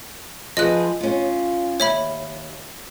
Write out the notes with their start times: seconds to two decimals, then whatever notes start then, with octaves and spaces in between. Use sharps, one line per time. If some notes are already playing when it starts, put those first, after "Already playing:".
0.57 F3 G#4 B4 D#5 F#6
1.01 C#4 F4
1.80 D#2 C#5 E5 B5